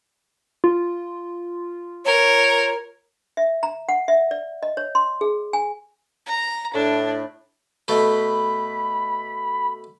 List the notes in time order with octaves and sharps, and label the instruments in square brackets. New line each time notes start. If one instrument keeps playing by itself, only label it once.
[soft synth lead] F4
[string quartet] A#4 [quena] C#5
[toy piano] E5
A#5
F#5
E5
D5
D#5
C#5
C6
G#4
G#5
[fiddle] A#5
[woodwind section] A2 [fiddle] D4
[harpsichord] B2 A3 [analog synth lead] B5